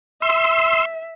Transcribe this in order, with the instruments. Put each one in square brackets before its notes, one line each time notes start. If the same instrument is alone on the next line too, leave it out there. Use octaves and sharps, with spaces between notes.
[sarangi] E5 [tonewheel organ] C6 E6